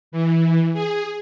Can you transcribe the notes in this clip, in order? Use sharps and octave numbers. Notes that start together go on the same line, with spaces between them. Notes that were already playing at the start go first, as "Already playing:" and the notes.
E3
G#4